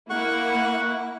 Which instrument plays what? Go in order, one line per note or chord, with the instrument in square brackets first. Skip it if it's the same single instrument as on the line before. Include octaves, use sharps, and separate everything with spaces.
[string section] A#3 E4 [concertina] F#5 C#6